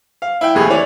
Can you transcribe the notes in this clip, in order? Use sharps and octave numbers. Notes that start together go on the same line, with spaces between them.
F5
E4 G5
F1 D#2 G#4 B5
E3 C#5 D5